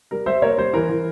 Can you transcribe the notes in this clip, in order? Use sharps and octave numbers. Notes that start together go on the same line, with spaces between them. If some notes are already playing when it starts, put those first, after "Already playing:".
G3 A#4
G3 C5 E5
A#3 A#4 C#5
G3 C5
E3 A#4
E3